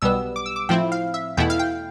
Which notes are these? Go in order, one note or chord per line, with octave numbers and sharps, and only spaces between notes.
B1 B2 G3 B3 E6
D6
E6
D6
A2 F3 C4 E4 G5
F5
E5
E2 B2 A3 E4 G5
F5
G5